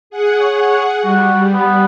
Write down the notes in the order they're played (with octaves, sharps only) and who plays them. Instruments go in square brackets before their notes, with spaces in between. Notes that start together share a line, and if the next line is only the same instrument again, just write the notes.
[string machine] G#4 F#5
[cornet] C#5
[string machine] G3 [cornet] F#4
[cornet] B3